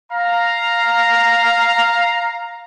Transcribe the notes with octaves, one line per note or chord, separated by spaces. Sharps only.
F5 A#5